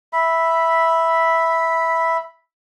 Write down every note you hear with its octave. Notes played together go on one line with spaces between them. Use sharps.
E5 B5